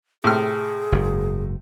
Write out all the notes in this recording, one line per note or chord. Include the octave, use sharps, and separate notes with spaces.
A2 C3 G#4 F6
F#1 G#2